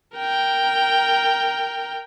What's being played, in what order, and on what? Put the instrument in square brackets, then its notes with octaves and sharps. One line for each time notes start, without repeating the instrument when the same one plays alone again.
[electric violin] A#4 G5